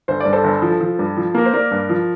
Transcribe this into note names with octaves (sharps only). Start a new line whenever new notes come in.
G1 C5
D5
G2
A4 C5
G1
F3
F3
G2
F3
A#3 A#4
C5
A#3 A#4 D5
G2
F3